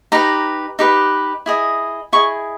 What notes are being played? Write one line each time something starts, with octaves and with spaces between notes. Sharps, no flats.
D#4 G4 B4 A#5
D#4 G4 B4
E4 G#4 D#5
E4 G#4 D#5 C#6